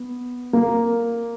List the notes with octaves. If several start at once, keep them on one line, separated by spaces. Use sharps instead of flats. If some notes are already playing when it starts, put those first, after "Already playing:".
Already playing: B3
A#3